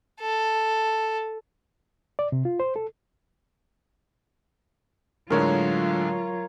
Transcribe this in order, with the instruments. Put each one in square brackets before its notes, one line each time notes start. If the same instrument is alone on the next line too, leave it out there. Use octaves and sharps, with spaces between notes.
[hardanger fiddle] A4
[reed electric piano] D5
C3
F4
C5
A4
[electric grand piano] A2 D3 G#3 [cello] F#3 F4 [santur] A#4 C#5 F5